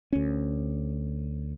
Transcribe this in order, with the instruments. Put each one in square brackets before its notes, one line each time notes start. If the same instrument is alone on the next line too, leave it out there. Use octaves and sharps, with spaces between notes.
[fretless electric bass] D2 C#4